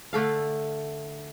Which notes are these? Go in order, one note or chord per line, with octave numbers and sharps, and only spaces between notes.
D3 A3 A4 F5